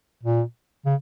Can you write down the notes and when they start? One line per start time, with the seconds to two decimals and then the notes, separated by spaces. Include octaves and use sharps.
0.23 A#2
0.86 C#3